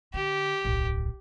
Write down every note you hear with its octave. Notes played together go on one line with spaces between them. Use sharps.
D3 G4
D1 B1